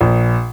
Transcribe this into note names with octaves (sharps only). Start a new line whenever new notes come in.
A#1